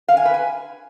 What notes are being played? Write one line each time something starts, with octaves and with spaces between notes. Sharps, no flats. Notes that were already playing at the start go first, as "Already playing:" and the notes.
F5
G#5
B4
G#5